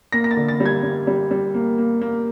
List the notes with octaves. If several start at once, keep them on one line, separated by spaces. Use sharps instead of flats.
A#3 A#6
A#6
A6
D3
A6
G3
G#6
G3
G3
G3
A#3
A#3
A#3